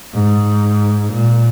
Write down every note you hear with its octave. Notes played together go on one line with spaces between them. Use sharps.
G#2
A#2